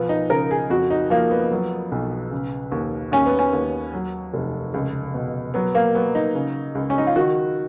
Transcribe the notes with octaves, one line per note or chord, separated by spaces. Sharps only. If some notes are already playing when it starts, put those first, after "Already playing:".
Already playing: B1 F3 B3
D#4
C#3 A#4
G#4
F2 F#4
D#4
F3 A#3
B3
F#3
B1
C#3
D#2
D#2 C#4
B3
C#4
D#2
F#3
F1
C#2
B2
F#3 B3
A#3
F#3 B3
D#4
C#3
C#2
C#4
D#4
F4
D#3 F#4